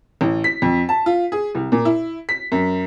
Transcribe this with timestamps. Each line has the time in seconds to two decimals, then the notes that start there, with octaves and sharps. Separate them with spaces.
0.21 A1
0.44 B6
0.62 F2
0.89 A5
1.06 F4
1.32 G#4
1.55 C2
1.72 A#2
1.85 E4
2.29 B6
2.52 F#2